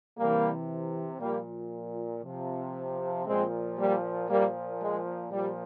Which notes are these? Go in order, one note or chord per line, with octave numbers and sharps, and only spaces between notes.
C3 E3 G3 A#3
A#2 F3 G3 A#3
C3 F3
A#2 F3 G#3 C4
G3 A#3
A#2 F3 G3 A#3
G#3
A#2 F3 G3